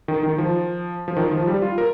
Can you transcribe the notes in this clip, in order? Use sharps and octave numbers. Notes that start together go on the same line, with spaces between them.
D#3
D#3
F3
F3
D#3
F3
G3
F4
A#4